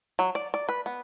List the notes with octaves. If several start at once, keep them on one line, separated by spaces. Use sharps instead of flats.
F#3
D5
D5
B4
B3